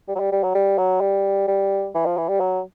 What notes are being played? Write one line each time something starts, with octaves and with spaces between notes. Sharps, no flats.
G3
F#3
G3
G3
F#3
G3
F#3
G3
G3
E3
F3
E3
G3
F#3